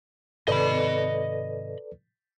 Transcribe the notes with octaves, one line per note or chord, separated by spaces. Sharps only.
G#2 C3 D#3 A4 B4 D5 D#5 B5